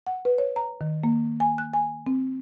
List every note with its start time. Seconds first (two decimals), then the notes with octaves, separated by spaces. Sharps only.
0.07 F#5
0.25 B4
0.38 C#5
0.56 A#5
0.81 D#3
1.04 A#3
1.40 G#5
1.58 F#6
1.74 G#5
2.07 C4